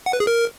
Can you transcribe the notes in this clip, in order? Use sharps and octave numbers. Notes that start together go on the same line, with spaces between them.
F#5
B4
G#4
A#4